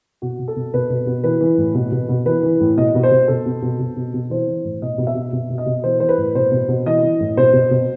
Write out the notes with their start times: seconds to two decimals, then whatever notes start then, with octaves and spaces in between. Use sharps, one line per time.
0.22 B2 F#4
0.39 B2
0.48 A4
0.56 B2
0.74 B2 B4
0.90 B2
1.07 B2
1.24 E3 B4
1.41 E3
1.58 A2
1.75 B2
1.92 B2
2.09 B2
2.26 E3 B4
2.43 E3
2.60 A2
2.77 B2 D#5
2.95 B2
3.03 C5
3.11 B2
3.28 B2 A4
3.46 B2
3.62 B2
3.80 B2
3.97 B2
4.14 B2
4.30 E3 C5
4.47 E3
4.65 A2
4.82 B2 D#5
4.98 B2
5.07 E5
5.15 B2
5.33 B2
5.50 B2
5.58 D#5
5.66 B2
5.84 E3 C5
6.00 E3 C5
6.09 B4
6.18 A2
6.35 B2 C5
6.51 B2
6.69 B2
6.86 E3 D#5
7.03 E3
7.20 A2
7.37 B2 C5
7.53 B2
7.71 B2